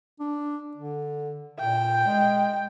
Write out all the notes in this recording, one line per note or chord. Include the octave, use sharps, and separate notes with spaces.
D4
D3
A#2 G5
G#3